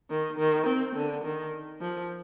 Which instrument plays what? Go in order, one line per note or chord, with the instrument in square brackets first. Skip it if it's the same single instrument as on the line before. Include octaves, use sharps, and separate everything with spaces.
[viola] D#3
D#3
C4
D3
D#3
F3